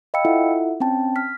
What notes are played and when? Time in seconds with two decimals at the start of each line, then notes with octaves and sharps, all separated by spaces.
0.14 D#5 F5 G5 B5 E6 C#7
0.25 E4 F4 A4 E5 F#5
0.80 C4 C#4 G5 A5
1.16 F6 B6